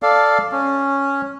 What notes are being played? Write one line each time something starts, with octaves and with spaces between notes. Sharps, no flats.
A4 D5 F5
C#4